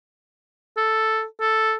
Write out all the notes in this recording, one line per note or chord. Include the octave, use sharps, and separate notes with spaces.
A4
A4